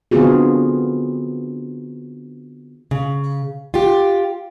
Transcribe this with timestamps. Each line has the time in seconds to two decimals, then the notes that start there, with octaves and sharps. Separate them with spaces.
0.11 D3 B3 C4 F4 F#4 G#4
2.91 C#3
3.74 F4 G4